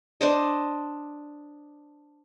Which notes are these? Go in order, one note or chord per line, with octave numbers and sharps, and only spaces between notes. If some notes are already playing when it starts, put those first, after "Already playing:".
D4 C5 D#5